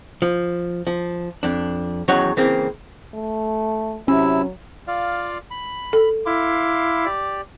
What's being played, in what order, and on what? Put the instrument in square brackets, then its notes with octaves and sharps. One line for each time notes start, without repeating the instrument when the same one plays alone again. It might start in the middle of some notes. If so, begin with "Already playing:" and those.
[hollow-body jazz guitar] F3
F3
F2 D4
E2 D#3 F#3 C#4 C#5 F#5
C#3 E3 A#3 C4
[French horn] A3
[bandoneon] C3 E4 E6 [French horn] F#3 [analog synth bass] C#4
[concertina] F4 D5 F5
B5
[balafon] A4
[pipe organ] E4 [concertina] F5 C6 D6
[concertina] G4 D5